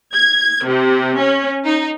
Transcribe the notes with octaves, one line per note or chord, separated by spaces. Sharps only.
G#6
C3
C#4
D#4